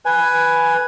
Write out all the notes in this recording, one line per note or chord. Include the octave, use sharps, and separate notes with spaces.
B4 G#5